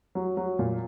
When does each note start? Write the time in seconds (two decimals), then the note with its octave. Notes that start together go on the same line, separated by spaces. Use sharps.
0.15 F#3
0.37 F#3
0.59 A#2